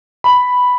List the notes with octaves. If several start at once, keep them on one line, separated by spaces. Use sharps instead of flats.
B5